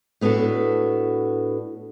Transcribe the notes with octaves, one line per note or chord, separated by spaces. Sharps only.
A2 B3 D4 F#4 A4